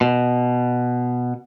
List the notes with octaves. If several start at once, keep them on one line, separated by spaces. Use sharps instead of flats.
B2